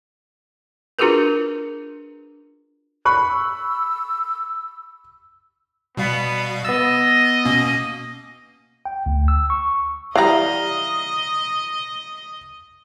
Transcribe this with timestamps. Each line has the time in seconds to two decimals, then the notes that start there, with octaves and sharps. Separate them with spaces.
0.99 D4 F4 F#4 G#4 A#4 B4
3.05 B5 C#6 F#6
3.30 E6
5.97 B2 G3 B3 F5
6.65 B3 D#5 E6 A6
7.45 B2 A#3 C#4
8.85 G5
9.06 D2
9.28 E6
9.50 C#6
10.16 E3 G3 D#5 F5 A#5